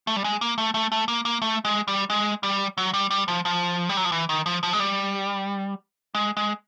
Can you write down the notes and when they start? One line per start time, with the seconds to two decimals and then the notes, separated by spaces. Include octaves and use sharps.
0.07 A3
0.16 G3
0.24 G#3
0.41 A#3
0.58 A3
0.74 A3
0.92 A3
1.08 A#3
1.25 A#3
1.42 A3
1.65 G#3
1.88 G3
2.10 G#3
2.43 G3
2.78 F#3
2.94 G3
3.11 G3
3.28 F3
3.45 F3
3.89 G3
3.97 F#3
4.05 F3
4.12 E3
4.29 D#3
4.46 F3
4.63 F3
4.73 G#3
4.80 G3
6.15 G#3
6.37 G#3